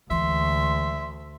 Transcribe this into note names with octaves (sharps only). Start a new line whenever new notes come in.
D2 E3 G#3 E5 C6